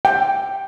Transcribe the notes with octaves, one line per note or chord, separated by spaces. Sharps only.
G5